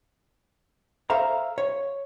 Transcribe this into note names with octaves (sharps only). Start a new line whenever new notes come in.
A4 C5 E5 F5 A#5
C#5